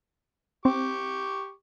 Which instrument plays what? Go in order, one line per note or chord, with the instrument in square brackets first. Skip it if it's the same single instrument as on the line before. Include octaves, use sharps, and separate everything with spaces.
[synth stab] C4 [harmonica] G4 C#6 D6